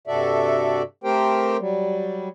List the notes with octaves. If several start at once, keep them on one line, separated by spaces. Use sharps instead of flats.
G2 C3 F#4 A4 D5 E5
A3 C4 G4 A#4 C5 G5
F#3 G3